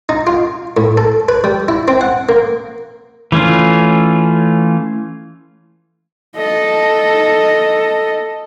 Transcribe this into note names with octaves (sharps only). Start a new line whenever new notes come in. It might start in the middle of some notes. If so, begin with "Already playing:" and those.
D#4
F4
A2
A4
B4
G3
E4
C4
F#5
A#3
E3 A3 C#4 F4
A4 D#5